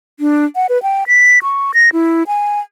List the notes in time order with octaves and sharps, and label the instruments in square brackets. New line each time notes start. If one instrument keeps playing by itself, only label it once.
[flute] D4
F#5
B4
G5
B6
C#6
A#6
E4
G#5